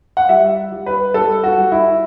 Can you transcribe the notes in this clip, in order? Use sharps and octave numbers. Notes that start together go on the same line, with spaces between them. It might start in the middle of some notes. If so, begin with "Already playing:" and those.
F#5
G3 E5
G3
B4
G3 A4
F#4
G3
E4